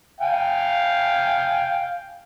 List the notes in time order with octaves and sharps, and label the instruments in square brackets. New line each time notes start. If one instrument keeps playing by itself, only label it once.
[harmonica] F5 G5 G#5